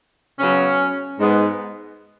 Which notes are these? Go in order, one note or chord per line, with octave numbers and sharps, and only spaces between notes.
C#3 F#3 B3 C#4
G#2 G#3 B3